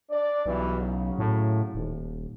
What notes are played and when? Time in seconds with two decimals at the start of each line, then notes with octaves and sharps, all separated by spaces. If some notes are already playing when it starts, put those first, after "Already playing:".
0.10 D4 D5
0.46 B1 G2 B2 E3
0.79 C#3 F#3
1.19 A2
1.75 D#1